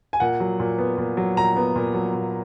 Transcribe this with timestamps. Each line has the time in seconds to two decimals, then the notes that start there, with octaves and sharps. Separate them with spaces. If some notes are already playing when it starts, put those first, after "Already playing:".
0.13 G#5
0.20 A#2 F#5
0.40 F#3
0.60 A#2
0.78 B3
0.98 A#2
1.17 F#3
1.37 A#2 A#5
1.56 B3
1.76 A#2
1.95 F#3
2.14 A#2